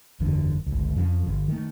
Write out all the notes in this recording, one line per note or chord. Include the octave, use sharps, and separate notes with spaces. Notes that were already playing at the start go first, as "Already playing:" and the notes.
F#1 E2 D3
G1 C#2
F2 F3 C#4
G1
D#3 A3